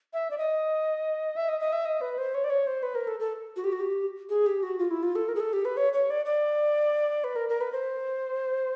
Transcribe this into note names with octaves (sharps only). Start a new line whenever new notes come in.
E5
D5
D#5
E5
D#5
D#5
E5
D#5
B4
C5
C#5
D5
C#5
C5
B4
A#4
A4
A4
F#4
G4
F#4
G4
G#4
G4
F#4
F4
E4
F4
A4
A#4
G#4
A4
G4
B4
C#5
C#5
D5
D5
B4
A#4
A#4
B4
C5